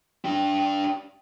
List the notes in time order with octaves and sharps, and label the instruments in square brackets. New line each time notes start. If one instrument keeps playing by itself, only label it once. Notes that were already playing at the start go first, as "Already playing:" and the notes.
[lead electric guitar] D4 G4